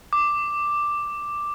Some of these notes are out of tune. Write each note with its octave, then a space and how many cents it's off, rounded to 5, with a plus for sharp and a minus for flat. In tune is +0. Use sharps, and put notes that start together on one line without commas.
D6 +5